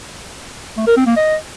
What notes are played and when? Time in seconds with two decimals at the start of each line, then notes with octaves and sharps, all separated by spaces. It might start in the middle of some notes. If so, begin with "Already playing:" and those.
0.77 A3
0.87 A#4
0.97 C4
1.07 A#3
1.16 D#5